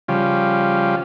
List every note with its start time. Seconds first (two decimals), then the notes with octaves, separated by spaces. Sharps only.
0.08 C#3 F3 G3